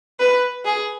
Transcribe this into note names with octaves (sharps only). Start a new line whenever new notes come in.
B4
G#4